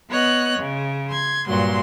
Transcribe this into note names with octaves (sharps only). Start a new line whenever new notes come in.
B3 C#5 D#5 F#6
C#3
C6 G#6
G2 A#2 F#3 C6